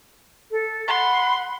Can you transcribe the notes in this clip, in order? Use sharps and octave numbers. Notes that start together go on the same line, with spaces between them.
A4
F#5 B5 C6